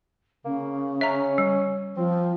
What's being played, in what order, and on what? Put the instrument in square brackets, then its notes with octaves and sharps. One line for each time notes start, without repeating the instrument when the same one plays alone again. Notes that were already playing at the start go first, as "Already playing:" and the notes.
[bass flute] C#3 [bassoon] A#3
[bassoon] C#4 [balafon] E5 A#5
[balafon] G3
[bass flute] F3 [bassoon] C4